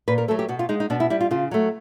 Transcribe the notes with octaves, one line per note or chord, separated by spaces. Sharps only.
A#2 B4
A#4
F#3 A3 A4
G4
B2 F#4
F4
G#3 D#4
D#4
B2 D4
E4
G3 E4
F4
C#3 F4
F#3 A3